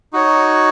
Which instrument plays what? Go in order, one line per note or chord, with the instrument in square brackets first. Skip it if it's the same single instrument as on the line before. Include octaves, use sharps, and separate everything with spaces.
[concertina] D#4 F#4 C#5